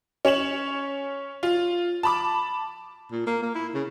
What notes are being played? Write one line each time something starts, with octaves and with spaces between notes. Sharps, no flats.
C#4 C#5 E7 F#7
F4
A5 B5 D6
A#2
A#3
A#3
E4
C#3